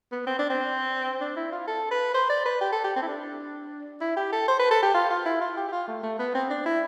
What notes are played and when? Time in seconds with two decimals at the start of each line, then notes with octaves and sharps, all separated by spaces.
0.12 B3
0.27 C4
0.39 D4
0.50 C4
1.21 D4
1.36 E4
1.52 F4
1.68 A4
1.91 B4
2.14 C5
2.30 D5
2.46 B4
2.61 G4
2.72 A4
2.84 G4
2.96 C4
3.02 E4
3.08 D4
4.01 E4
4.16 G4
4.32 A4
4.48 C5
4.59 B4
4.71 A4
4.83 G4
4.94 F4
5.10 F4
5.25 E4
5.41 F4
5.57 G4
5.68 G4
5.72 F4
5.88 A3
6.03 A3
6.19 B3
6.35 C4
6.50 D4
6.66 E4